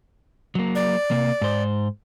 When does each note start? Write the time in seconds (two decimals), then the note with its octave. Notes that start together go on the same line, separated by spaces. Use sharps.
0.55 F#3 A#3
0.75 D5
1.11 C3 A#3
1.41 G#2 C5